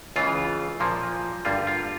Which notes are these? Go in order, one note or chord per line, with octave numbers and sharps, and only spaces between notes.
C#2 C#3 E3 F4
A#2 F3 A#3
G2 D3 G3 A#3 F4
F4